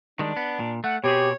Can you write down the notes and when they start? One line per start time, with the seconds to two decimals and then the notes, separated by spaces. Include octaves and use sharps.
0.19 D#3 G3 G#3 D4
0.37 B3
0.59 A#2
0.84 A3 F#5
1.04 B2 C4 G4 G#4 C#5